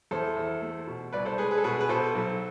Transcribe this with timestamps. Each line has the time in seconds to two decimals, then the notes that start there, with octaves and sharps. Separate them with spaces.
0.11 E2 A4 C5
0.37 E2
0.62 A3
0.87 B2
1.13 C2 B4 D5
1.25 A4 C5
1.38 G#3 G#4 B4
1.51 G#4 B4
1.58 A4
1.64 B2 G#4 B4
1.81 B4
1.89 B2 A4 C5
2.15 B1